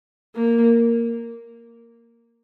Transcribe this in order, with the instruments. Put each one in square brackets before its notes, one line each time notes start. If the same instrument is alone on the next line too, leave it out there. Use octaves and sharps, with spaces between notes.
[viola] A#3